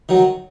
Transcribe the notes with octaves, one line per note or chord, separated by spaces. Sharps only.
D#3 F#3